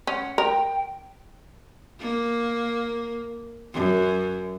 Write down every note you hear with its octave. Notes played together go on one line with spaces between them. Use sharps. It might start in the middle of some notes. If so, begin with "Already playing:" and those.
C#4 F#5
A#4 G5
A#3
F#2